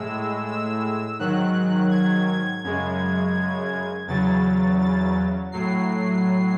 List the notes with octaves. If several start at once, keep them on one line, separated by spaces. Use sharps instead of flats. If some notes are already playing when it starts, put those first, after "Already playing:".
Already playing: A2 G#3 E6
E6
G#2 D#3 F#3 F#6
G#6
G#6
F#2 C#3 G#3
E2 C#3 F#3 A6
A6
A2 F#3 C7